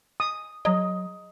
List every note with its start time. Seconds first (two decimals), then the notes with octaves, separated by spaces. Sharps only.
0.20 D#6
0.65 F#3 D#5